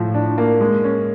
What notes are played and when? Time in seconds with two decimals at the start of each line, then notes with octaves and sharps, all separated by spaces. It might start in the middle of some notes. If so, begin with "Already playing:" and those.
Already playing: A2 F3
0.14 D4
0.38 A#3
0.61 G#3
0.84 C#4